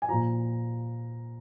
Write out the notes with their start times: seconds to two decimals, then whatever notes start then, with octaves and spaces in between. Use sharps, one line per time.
0.02 G#5
0.08 A#2 F3 A#5